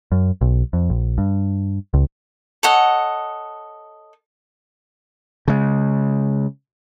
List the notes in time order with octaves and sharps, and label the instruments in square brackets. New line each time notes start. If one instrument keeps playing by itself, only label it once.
[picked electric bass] F#2
B1
F2
A#1
G2
C#2
[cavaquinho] A4 C#5 D#5 F#5
[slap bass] C#3 G#3